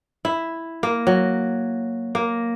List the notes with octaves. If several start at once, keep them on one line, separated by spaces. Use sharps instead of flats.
E4
A#3
F#3
A#3